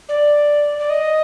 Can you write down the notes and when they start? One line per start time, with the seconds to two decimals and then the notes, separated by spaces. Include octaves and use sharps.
0.09 D5
0.79 D5
0.90 D#5